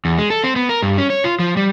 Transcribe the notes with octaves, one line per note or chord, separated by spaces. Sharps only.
E2
G#3
A4
C4
B3
A#4
G2
C#4
C#5
F4
F3
G3